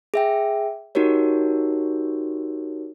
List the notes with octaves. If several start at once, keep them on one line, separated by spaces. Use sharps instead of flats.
G#4 E5 G5
D#4 F#4 G4 A#4 C#5